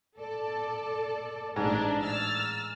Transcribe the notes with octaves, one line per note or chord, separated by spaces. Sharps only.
A4 D5
A1 G#2 D4
E6 F6 A6